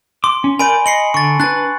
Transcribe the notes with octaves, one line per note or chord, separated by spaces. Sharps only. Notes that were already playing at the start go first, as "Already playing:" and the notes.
C6 D6
C#4
A#4 D5 G#5 B5 G6 D7
D#5 C7 C#7 F#7
D3 C#6 A6
D4 B4 F#6 A6